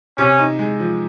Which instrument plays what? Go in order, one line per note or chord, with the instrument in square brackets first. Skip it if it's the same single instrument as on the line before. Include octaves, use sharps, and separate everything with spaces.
[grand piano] C3 [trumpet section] C#4
[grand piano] D#4
G#3
F3